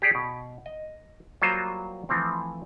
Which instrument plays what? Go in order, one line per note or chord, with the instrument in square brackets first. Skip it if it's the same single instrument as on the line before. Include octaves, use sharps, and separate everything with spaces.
[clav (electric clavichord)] G4 G#4 D5 F#5
B2
D#5
F#3 G3 A#3 F4 C5
E3 F3 A3 C4